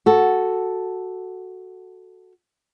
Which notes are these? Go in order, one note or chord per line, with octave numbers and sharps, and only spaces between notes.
F#4 A4